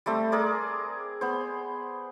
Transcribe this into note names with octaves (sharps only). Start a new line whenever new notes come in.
G3 A3 C4
G#4 A#4 D5
B3 C5